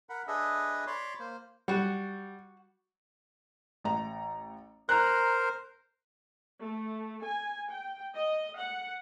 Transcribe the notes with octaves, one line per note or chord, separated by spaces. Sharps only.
A#4 F#5 B5
D4 G#4 A4 B4 D#5 E5
C#5 D5 B5 C6
A#3 C5
G3 F#4 F#5
A1 A#5
A#4 C5 A#5 F#6
A3
G#5
G5
D#5
F#5